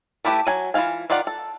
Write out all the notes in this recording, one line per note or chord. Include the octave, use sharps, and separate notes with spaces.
A3 E4 G4 A4 B4
F#3 G#5
E3 F3 F4 F5 G#5
D#3 F4 D5 F5 F#5
A4